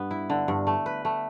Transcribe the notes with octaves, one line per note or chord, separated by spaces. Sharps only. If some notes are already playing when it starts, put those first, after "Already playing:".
Already playing: G2 B3
E4
D3
G2
A3
B4
A3